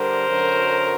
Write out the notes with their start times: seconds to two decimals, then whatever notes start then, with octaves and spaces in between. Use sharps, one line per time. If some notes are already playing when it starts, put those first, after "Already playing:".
Already playing: D3 G3 A#4 C5
0.28 F#2 D3 F#3